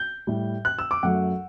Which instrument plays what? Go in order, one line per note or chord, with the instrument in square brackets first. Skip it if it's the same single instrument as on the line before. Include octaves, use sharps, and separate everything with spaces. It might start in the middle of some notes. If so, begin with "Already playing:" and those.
Already playing: [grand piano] G6
A2 G3
F#6
E6
D6
F#2 F#3 A3 F#5